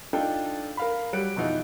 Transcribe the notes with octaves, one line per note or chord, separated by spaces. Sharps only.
D4 D#4 F4 A4 D5 G5
A#4 F5 B5
F#3 G3 F#6 D7
F2 B2 E3 D#4 F4